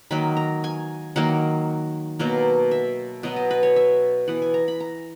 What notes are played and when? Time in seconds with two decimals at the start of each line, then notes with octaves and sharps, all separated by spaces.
0.11 D#3 F#3 A#3 B5
0.37 A#5
0.64 G#5
1.16 D#3 F#3 A#3 F#5
2.19 B2 F#3 A#3
2.71 E5
3.23 B2 F#3 B3 D#5
3.36 D#5
3.51 B4
3.63 C#5
3.76 E5
4.28 E3 B3 F#5
4.42 G#5
4.54 A#5
4.68 B5
4.80 A#5